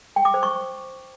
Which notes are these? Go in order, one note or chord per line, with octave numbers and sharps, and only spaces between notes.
G5
D6
C5
C#6